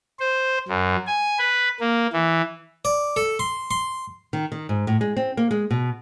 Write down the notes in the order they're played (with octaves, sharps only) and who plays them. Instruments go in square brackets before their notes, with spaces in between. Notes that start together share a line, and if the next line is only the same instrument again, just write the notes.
[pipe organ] C5
F#2
G#5
B4
A#3
E3
[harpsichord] D5
A4
C6
C6
[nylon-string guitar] D#3
D#3
G#2
A2
G#3
C4
A#3
G#3
B2